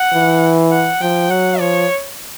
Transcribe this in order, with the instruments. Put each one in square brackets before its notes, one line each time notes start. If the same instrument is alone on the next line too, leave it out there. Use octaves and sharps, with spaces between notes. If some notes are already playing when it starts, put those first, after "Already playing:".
Already playing: [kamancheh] F#5
[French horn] E3
[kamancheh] F#5
[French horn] F3 [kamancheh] G5
[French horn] F#3 [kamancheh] F#5
[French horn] F3 [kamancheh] C#5